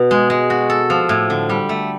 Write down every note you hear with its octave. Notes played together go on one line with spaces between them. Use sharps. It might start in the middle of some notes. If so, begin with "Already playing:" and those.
Already playing: B2
G#3
G#3
F#4
A4
F3
A2
D3
G3
A3